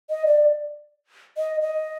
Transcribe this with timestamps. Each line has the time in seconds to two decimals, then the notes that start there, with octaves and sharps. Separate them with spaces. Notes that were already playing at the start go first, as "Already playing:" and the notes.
0.10 D#5
0.26 D5
1.38 D#5
1.61 D#5